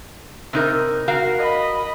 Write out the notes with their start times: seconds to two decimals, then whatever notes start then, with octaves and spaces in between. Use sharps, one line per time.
0.53 C3 D#4 A#4
1.08 F#4 A#4 F5
1.38 D#5 B5